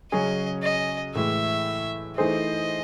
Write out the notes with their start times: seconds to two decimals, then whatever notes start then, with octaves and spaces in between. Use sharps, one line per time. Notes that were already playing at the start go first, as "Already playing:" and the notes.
0.12 C#3 F#3 C#4 G#4 D#5
0.63 D#5
1.15 A2 E3 G#3 E5
2.18 E3 A3 D#4 G#4 C5 D#5